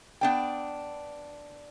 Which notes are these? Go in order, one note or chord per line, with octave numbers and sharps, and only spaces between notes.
B3 D4 G5